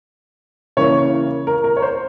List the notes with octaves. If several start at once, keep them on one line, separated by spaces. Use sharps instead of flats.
C#3 E3 A#3 C#5
A#4
A#4
C#5
C5